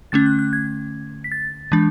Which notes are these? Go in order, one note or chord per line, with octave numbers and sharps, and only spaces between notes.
D3 A3 C#4 A6
F#6
F#6
G#6
B6
A6
E3 G#3 D4